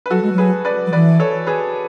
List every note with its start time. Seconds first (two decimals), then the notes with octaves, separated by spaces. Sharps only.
0.06 B4
0.10 F#3 F#4 A4
0.22 G#3
0.33 F#3
0.38 G#4 B4
0.65 B4 D5
0.87 F#3
0.93 E3 B4 D5
1.20 A4 C#5
1.47 G#4 B4